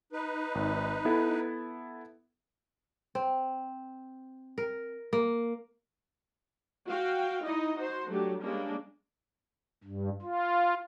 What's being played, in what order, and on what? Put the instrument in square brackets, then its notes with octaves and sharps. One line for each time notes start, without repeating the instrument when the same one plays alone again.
[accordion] D#4 B4
[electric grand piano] G#1
B3 E4 A4
[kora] C4
A#4
A#3
[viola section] F#4 F5 G5
D#4 E4 D#5
D#4 F#4 C5
F#3 A3 D4 G4
G3 G#3 A#3 C#4 D4
[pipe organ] G2
F4